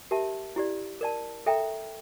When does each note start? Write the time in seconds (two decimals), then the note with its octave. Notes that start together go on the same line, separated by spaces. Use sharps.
0.11 G4 A#4 E5 A5
0.56 E4 G4 D5
1.01 A#4 D5 A5
1.46 A4 E5 G5 A#5